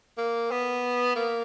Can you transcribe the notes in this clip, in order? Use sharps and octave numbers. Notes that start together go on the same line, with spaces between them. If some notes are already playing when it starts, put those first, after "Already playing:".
A#3
B3
A#3